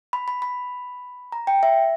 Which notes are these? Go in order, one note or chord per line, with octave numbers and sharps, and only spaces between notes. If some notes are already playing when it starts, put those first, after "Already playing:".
B5
B5
B5
A#5
G5
E5